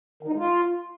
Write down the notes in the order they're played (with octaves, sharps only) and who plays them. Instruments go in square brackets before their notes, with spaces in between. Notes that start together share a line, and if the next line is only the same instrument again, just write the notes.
[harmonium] D#3
D#4
G#3
F4